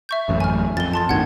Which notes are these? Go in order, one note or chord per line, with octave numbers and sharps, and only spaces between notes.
E5 C#6 G6
A1 F#2
G#5 F6
F2 A6 G7
A5 C6 A6
G1 D2 D#3 F#5 G#6